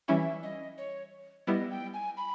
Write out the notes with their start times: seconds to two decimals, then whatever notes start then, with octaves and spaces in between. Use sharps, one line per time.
0.08 E3 G3 C#4 E4 E5
0.43 D#5
0.78 C#5
1.47 G3 B3 E4 D#5
1.71 G5
1.94 G#5
2.17 B5